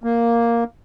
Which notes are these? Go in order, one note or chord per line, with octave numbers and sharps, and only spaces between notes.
A#3